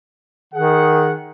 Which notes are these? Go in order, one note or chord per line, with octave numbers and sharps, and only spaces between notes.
D#3 G#4 F#5